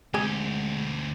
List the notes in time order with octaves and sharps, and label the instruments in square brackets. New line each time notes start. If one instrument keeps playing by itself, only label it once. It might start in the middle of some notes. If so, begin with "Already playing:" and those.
[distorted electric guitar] D2 G4 [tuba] G#3 [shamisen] A#3 C4 G#4